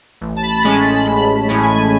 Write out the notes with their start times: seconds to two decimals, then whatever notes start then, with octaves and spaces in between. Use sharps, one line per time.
0.21 A1
0.36 A5
0.43 B5
0.63 A2 G#3 C#4 A5
0.85 B5
1.06 A1 B5
1.49 A2 G#3 C#4
1.63 G#5